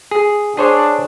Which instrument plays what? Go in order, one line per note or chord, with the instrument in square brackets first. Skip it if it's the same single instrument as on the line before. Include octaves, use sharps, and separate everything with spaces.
[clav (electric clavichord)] G#4
[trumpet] D4 [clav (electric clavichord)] G#4 C5 C#5